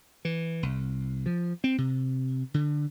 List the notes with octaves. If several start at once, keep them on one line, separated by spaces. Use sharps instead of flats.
E3
C2
F3
C4
C3
D3